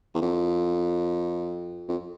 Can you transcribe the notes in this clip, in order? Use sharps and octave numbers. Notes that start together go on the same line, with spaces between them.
E2
F2
F2